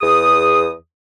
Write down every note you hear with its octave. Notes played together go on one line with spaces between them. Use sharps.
E2 G#4 D#6